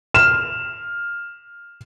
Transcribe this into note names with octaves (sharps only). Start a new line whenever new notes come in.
F6 E7